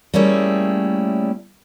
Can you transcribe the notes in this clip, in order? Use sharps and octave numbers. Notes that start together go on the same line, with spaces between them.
G3 A3 A#3 C#4 E4 G#4